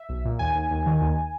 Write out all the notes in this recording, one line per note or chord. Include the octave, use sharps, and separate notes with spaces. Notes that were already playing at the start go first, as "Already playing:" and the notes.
Already playing: E5
B1
A#2
D#2 G#5
D#2
D#2
D#3
D#2